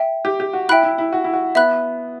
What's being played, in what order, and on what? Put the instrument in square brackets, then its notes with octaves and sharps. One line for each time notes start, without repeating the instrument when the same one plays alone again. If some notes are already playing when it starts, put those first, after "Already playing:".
Already playing: [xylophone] E5 G5
[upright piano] G4
G4
F#4
[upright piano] E4 [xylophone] E5 G5 B5 F#6
[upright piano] E4
E4
F#4
E4
F#4
[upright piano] B3 [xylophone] E5 B5 F#6